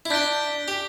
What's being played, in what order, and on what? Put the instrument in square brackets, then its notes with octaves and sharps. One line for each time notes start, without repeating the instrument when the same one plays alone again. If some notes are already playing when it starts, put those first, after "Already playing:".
[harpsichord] E4
[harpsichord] D4 [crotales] G6 B6 D7 G7
[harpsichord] G4